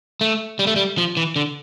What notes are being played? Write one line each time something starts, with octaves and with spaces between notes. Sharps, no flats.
A3
G3
A3
G3
F3
E3
D3